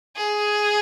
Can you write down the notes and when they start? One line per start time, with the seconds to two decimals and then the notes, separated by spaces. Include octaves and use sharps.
0.17 G#4